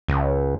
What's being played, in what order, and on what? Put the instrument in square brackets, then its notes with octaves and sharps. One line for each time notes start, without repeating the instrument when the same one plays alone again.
[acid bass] C#2